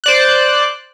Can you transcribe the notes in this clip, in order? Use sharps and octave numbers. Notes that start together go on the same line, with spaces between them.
C5 D5 F#6